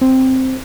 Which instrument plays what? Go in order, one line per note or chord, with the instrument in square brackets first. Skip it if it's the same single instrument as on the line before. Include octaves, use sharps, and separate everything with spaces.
[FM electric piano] C4